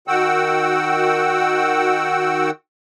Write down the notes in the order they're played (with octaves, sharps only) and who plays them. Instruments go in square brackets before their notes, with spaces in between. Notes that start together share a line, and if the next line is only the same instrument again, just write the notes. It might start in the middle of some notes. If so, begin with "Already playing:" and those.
[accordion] D#3 F#4 F#5 G5 E6